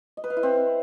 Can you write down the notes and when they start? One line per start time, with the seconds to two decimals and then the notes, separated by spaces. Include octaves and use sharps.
0.17 D#5
0.24 B4
0.30 F5
0.37 E4
0.43 C4